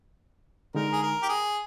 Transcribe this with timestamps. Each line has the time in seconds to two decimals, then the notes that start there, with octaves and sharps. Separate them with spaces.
0.75 D3 G#3 D#4 A#4
0.92 G#4
1.02 A#4
1.23 G4
1.29 G#4